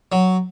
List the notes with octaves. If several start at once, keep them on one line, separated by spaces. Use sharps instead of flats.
F#3